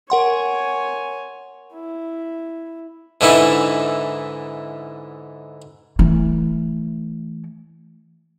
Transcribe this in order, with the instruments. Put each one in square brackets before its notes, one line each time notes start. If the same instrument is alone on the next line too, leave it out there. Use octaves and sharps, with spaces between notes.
[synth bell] A#4 F#5 C6 [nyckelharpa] C#5 G#5
[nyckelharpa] E4
[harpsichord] G#2 D3 E3 D#4 E4
[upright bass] E3 A3